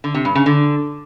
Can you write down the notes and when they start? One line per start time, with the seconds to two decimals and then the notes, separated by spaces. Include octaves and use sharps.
0.04 D3
0.14 C3
0.25 G2
0.35 C#3
0.46 D3